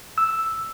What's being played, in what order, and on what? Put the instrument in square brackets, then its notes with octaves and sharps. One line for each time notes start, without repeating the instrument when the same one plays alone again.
[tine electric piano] E6